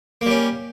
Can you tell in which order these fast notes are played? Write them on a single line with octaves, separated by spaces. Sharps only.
A#3 G3 C#4